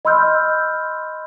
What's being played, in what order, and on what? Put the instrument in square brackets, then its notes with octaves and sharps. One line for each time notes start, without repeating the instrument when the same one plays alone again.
[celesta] D#5 B5 C6 E6 F6 G6